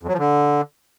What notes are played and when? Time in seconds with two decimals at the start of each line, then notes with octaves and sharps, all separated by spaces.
0.03 F2
0.08 F#3
0.13 F3
0.18 D3